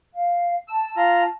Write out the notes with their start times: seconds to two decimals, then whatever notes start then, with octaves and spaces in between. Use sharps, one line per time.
0.14 F5
0.68 A5 E6
0.96 F4 A#5